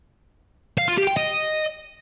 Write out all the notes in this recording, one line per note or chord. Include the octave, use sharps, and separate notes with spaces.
F5
F4
G4
G5
D#5